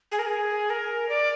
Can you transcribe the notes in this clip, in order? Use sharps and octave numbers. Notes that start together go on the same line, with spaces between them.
G#4
A#4
G#4
A#4
D5